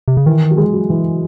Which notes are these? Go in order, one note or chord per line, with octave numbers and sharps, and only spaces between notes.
C3
C#3
D#3 E3
F#3
G#3
F#3
E3